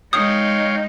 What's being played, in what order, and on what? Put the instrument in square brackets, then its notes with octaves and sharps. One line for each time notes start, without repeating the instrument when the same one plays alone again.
[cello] G#3 D#4 [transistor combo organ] C#5 F5 G5 [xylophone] D#6